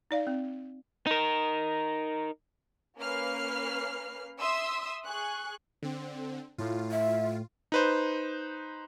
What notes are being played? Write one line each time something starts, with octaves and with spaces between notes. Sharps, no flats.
D#4 D5 F5
C4
D#4 A#4
A#3 C#4 B4 F6 C7
E5 C6 D#6 E6
G#4 C#6 F#6
D3 C4
A2 F4
E5
D#4 B4 C5